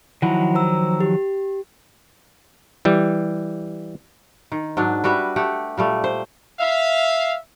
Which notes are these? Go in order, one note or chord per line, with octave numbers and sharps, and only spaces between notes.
D#3 F3 F#3 E4 F#5 B5
C5 A#5 E6
G4
E3 G3
D#3
G#2 F#3 D4
G3 F#4 B4 E5
A3 G4 F#5
A#2 G3 A3
C5
E5 F5